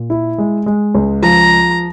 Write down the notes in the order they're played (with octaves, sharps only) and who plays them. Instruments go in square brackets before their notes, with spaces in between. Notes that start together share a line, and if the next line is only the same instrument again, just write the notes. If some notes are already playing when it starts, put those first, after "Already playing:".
Already playing: [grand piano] A#2
E4
G#3
G#3
C#2
[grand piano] F3 [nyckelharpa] A#5